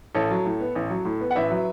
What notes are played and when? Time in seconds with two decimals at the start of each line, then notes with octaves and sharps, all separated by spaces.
0.15 A1 A4 C#5
0.30 F#3
0.45 A2
0.60 B3
0.75 A1
0.90 F#3
1.05 A2
1.21 B3
1.31 F#5
1.35 A1 B4 E5
1.50 F#3